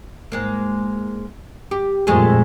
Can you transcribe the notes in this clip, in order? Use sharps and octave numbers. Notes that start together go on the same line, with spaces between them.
G#2 G#3 A#3
G4
F2 A#2 G#3 A3 G#4